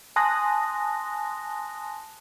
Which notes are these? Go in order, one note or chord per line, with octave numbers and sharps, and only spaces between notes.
G#5 A5 C6 D#6 F#6 A#6